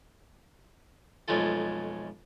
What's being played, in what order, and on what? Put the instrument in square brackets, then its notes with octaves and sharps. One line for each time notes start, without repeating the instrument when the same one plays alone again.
[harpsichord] B1 F2 G#3 A3 F4 A4